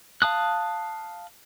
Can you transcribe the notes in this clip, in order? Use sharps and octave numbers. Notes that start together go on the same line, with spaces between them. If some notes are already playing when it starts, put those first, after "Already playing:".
F5 A5 D#6 F#6